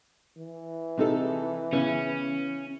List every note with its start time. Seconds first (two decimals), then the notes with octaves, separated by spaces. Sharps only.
0.37 E3
0.98 C3 D#4 A4
1.72 C#3 B3 C#4 E4